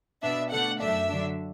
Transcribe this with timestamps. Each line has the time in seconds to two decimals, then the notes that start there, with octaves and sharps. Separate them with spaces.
0.22 B2 B3 D4 E5
0.51 D3 A3 D4 F#5
0.80 F#2 F#3 A3 D4 E5
1.09 D3 F#3 D4